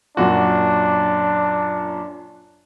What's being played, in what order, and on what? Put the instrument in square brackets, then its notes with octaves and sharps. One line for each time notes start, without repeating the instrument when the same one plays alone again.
[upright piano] F#2 A#2 F#4 [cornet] D4